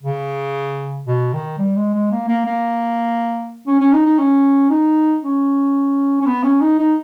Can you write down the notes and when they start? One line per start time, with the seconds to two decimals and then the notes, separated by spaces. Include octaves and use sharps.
0.03 C#3
1.07 B2
1.33 D#3
1.58 G3
1.76 G#3
1.94 G#3
2.11 A#3
2.28 A#3
2.46 A#3
3.67 C#4
3.80 C#4
3.93 D#4
4.06 D#4
4.18 C#4
4.70 D#4
5.22 C#4
6.21 C#4
6.26 B3
6.43 C#4
6.61 D#4
6.79 D#4